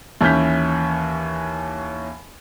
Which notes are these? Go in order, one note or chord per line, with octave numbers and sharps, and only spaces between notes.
D#2 E3 C#4 F6 G6 B6